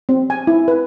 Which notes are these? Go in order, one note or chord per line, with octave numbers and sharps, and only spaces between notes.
C4
G#5
E4
B4